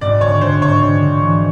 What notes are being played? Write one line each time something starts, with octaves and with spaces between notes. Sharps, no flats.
G#1 D5
D3 C#5
D3 C5
G#1 C#5
D3
G#1
E3